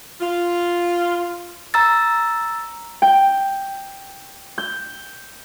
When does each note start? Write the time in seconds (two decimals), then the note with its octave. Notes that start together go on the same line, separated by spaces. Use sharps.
0.21 F4
1.74 A#5 E6 A6
3.02 G5
4.58 G6